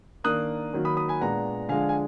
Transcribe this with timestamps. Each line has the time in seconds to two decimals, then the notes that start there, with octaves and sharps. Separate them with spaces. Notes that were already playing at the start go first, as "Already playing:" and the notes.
0.24 D#3 A#3 D4 D#6 F#6
0.73 D#3 F#3 A#3
0.85 B5 D#6
0.97 B5 D#6
1.08 G#5 B5
1.21 A#2 G#3 B3 D4 F#5 A#5
1.69 D3 F3 G#3 D4 F5 G#5
1.89 G#5